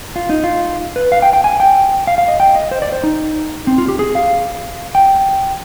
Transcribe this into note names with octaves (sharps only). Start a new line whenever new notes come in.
F4
D#4
F4
B4
F5
G5
G5
G#5
G5
F5
F5
D#5
G5
D#5
C5
D5
C5
D#4
C4
F4
G4
G#4
F5
G5